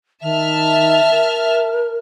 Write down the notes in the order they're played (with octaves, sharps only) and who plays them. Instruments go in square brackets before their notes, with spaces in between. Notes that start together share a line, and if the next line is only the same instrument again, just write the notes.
[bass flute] D#3 [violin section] E5 A5 F6
[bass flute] A#4